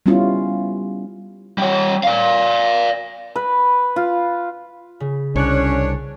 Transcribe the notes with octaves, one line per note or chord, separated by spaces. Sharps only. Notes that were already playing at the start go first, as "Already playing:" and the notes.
G3 B3 C#4 E4 F4
G3 C#5
D5 F5
B4
F4
C#3
C2 C#4 D4 C#5 C#6 F#6